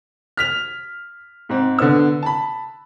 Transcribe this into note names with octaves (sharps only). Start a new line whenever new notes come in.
F6 B6 F7
G#2 C4
D3 B3 E6
A5 B5